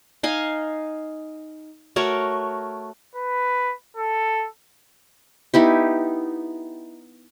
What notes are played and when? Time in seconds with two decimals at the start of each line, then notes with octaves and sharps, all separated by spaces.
0.23 D#4 D#5 F5 G#5
1.96 A3 F#4 A#4 C#5
3.15 B4
3.97 A4
5.54 B3 D#4 E4 G4